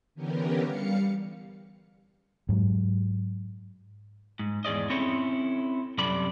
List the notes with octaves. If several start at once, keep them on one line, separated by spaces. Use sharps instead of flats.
D3 E3 B3 C#4 G4 A#4
G3 F5 C#7
G#2 F#3
G#2
E2 G#2 G#4 D5 D#5
C4 C#4 E4 A4 C#5
F#2 C3 G3 A4 D5 B5